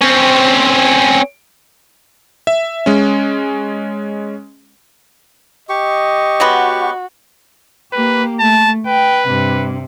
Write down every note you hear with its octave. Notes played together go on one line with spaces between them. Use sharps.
C4 C#4
E5
G#3 C#4
G4 D#5 C#6
F#3 G#3 B3 F#4
A#3 G4 B4
A3 A5
B4 G5
G2 C3